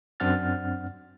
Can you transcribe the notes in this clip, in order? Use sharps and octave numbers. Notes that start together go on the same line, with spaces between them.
F#2 C4 D4 F#5 F6 A6